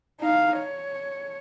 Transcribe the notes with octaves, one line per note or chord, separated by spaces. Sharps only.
D#4 F5
C#5